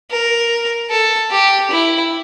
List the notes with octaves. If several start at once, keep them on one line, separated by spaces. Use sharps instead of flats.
A#4
A4
G4
E4